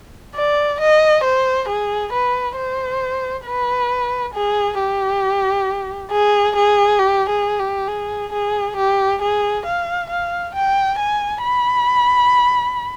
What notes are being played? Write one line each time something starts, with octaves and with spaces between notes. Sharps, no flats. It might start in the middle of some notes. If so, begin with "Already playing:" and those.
D5
D#5
C5
G#4
B4
C5
B4
G#4
G4
G#4
G#4
G4
G#4
G4
G#4
G#4
G4
G#4
F5
F5
G5
G#5
B5